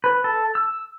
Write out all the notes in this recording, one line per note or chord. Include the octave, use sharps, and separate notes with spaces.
B4
A4
E6